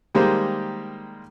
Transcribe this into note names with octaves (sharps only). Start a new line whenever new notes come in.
D#3 G3 G#3 A#3 G4 C5